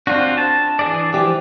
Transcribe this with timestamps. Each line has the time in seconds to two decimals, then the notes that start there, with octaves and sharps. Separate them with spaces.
0.07 C4 D4 F4 F#4
0.38 A5
0.79 E3 G#4 D5
1.14 E3 F3 G4